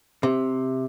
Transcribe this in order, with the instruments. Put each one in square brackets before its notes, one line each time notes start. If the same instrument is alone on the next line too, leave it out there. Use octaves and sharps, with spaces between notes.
[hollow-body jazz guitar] C3